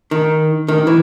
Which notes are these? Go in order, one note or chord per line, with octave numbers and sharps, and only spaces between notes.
D#3
D#3
E3